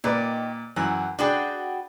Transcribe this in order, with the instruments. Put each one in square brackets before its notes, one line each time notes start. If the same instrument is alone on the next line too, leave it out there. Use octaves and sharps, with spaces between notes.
[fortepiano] A#2 B4 D5 [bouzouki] D#3
[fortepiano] F#2 E3 [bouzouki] F#5
[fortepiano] D4 G#4 D5 [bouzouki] F#4 B4 G5